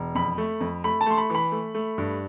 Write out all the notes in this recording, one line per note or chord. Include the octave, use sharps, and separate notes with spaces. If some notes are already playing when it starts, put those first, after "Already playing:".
Already playing: E1
F2 B5
A3
F2
A3 B5
A5
A3 C6
B5
E3 B5
A3
A3
G2